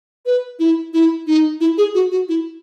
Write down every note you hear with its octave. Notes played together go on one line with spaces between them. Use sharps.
B4
E4
E4
D#4
E4
G#4
F#4
F#4
E4